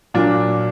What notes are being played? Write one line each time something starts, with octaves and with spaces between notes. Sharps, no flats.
A#2 F#3 A#3 D4